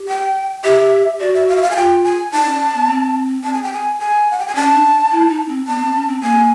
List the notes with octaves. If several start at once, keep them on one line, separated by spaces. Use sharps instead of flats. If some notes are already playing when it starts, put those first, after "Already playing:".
Already playing: G4
G5
G4 E5
F#4 D5
E5
F5
E5
F5
G#5
F4 G5
G#5
D#4 A5
C#4
B3
C4
A5
G#5
G5
G#5
G#5
F#5
G5
G#5
C#4 A5
D4
E4
D#4
C4
B3 A5
C4
C#4
C4
A#3 G#5